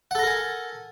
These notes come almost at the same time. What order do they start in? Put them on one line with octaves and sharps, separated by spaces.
F#5 A4 A#5 A#4 G#5